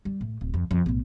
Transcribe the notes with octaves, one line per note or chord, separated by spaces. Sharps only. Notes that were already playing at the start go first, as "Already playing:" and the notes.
G3
A2
D1
F2
F2
B1 A2